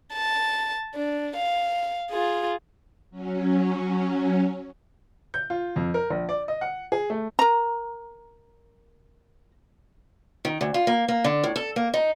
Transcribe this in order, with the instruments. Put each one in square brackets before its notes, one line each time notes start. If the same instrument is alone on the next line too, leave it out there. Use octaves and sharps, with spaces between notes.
[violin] A5
D4
F5
F4 G#4
[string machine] F#3 C#4
[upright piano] G6
F4
F2
A#4
A#1
D5
D#5
F#5
G#4
A3
[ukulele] A#4 A#5
[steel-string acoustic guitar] D#3
D2
F4
A#3
A#3
D3
A2
A4
A#3
D#4